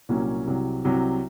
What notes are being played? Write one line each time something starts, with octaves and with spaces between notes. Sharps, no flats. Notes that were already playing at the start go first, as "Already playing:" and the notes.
C2 A#2 F#3 A#3 C#4
C2 C3 F#3
C2 C3 F#3